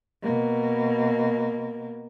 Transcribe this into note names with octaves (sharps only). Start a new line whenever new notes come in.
B2 A#3